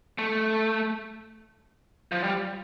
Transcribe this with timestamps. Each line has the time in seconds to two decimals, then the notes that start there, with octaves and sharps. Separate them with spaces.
0.18 A3
2.12 F3
2.24 G3